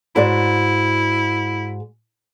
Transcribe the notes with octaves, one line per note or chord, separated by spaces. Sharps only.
G#2 E4 F#4 D5